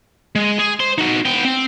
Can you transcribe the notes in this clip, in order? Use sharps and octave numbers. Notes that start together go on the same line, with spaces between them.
G#3
G#4
C5 C6
D#4 F#4
B3 G5
C4